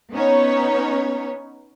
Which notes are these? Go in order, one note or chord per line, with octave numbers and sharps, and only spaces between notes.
B3 C#4 D#4 C#5